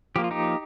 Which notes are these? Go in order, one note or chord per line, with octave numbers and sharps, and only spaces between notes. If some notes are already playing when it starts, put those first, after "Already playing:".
F3 A#3 G4
F4
D#4 G4